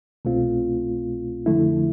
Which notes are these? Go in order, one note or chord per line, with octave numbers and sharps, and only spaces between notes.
C2 B2 A3 C4 F4
F2 D3 F3 A3 E4